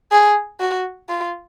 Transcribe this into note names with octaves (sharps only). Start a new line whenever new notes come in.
G#4
F#4
F4